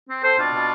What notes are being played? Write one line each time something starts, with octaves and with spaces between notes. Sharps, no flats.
C4
C4 A4 C5
B2 D4 F4
B2